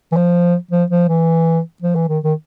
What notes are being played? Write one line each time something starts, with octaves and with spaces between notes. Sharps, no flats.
E3
F3
F3
F3
E3
F3
E3
D#3
D#3